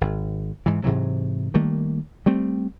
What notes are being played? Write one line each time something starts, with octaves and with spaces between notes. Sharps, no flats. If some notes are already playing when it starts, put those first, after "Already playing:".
G#1
G#2 E3
G#2 C3 E3 F#3
D#3 G3 A3 A#3
G3 A3 C4